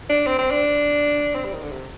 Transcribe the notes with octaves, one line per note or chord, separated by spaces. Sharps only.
D4
C4
C4
D4
C4
G3
D#3
D3
C3